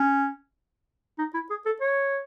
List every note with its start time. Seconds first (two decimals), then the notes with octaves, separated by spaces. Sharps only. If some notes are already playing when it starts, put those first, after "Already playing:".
Already playing: C#4
1.18 D#4
1.34 E4
1.50 G#4
1.66 A4
1.81 C#5